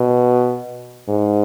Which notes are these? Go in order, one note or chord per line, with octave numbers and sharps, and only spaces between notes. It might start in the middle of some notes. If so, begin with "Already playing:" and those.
Already playing: B2
G#2